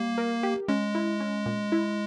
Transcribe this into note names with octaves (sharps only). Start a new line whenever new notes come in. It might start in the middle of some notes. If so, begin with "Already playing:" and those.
Already playing: G3 A#3
A#4
G4
G#3 C#4
E4
C#4
A#2
E4